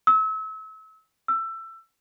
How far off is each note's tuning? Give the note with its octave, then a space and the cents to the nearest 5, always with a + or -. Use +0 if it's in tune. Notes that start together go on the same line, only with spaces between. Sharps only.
E6 -35
E6 +20